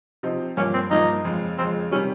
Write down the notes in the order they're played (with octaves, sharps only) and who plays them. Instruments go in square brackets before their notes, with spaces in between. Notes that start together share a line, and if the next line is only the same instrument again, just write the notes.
[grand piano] C3 F3 C4 D#4
[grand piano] G2 F3 A#3 [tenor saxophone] C#4
[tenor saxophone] C4
[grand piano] G2 F3 A#3 [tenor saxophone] D#4
[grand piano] F2 C#3 F3 G#3
[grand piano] F2 C#3 F3 G#3 [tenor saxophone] C4
[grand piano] C3 D#3 G3 [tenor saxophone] C#4